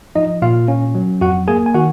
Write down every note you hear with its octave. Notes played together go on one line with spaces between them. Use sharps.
F3 D#4 D#5
A#2 F4 F5
C#4
F#3
F2 F#4 F#5
A#3 G#4 G#5
G#5
D#3 F#4 F#5